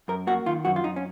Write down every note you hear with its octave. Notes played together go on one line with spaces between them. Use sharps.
F#2 A#4
A#3 F#4
D#3 F4
F#2 F#4
F4
F#2 D#4
C#4